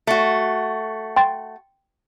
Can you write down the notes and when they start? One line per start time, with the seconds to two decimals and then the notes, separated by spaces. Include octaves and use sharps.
0.07 A3 F#4
1.16 G5 C6 A6